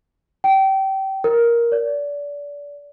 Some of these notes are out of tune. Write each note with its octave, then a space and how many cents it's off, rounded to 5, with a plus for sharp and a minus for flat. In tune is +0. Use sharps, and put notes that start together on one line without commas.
G5 -25
A#4 +10
D5 -30